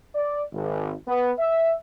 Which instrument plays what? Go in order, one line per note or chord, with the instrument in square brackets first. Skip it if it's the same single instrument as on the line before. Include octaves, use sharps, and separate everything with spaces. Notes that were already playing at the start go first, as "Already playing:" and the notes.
[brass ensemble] D5
G#1
B3
E5